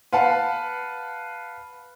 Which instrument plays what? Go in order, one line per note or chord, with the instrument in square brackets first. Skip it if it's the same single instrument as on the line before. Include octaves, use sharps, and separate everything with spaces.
[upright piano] B4 F5 F#5 A5